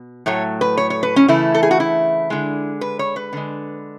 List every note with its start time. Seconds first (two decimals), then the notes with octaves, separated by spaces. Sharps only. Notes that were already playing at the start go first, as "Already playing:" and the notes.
Already playing: B2
0.26 A2 F#3 A3 C#5
0.61 B4
0.77 C#5
0.90 C#5
1.03 B4
1.16 C#4
1.28 C#3 E3 A3 E4
1.54 A4
1.63 G#4
1.71 F#4
1.80 E4
2.30 D3 G#3
2.81 B4
2.99 C#5
3.16 B4
3.33 D3 G#3